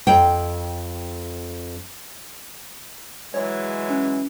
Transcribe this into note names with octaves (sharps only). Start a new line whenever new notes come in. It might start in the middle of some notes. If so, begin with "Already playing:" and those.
F2 G5
E3 F#3 G#3 C#5
C#4